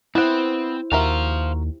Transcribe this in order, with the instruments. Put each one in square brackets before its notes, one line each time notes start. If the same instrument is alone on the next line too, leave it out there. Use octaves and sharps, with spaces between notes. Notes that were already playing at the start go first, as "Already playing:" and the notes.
[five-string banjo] B3 F#5 [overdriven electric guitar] C4 [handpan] E4 C5
[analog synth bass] D#2 [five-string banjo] F#4 A#4 E5 [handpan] G4 [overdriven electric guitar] C5 F5